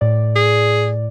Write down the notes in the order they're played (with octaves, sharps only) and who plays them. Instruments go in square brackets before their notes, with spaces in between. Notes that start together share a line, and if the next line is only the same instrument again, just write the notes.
[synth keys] A2 D5
[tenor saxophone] G#4